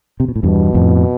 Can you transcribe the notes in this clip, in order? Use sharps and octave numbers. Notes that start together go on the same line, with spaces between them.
C3
B2
A2
E2 G2 B2
F2 A2